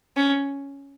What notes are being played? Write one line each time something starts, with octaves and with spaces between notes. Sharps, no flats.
C#4